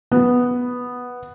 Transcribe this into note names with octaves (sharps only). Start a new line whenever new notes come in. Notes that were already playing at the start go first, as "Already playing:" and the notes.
B3